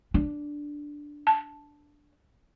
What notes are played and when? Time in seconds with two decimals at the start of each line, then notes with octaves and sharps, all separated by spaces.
0.14 D4
1.27 A5